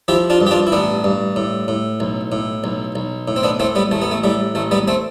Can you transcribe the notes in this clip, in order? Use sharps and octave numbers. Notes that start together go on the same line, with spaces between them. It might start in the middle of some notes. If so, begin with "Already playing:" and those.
F3 E4 G4
D4 F4
G2
G4
D4 F4
E4
A1 B3 D4
G2
A2
A2
B1
A2
B1
B1
A2
C4
B3 D4
A2 A3 C4
G3 B3
A1 A3
B3
A3
A2 G3
A1 A3
G3 B3
A3 C4